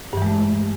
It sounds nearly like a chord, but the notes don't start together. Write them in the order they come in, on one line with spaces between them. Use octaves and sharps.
G2 E3 G#3 A3